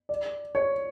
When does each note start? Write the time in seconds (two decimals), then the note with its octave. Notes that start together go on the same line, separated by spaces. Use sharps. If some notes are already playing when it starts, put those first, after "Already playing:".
0.09 D5
0.55 C#5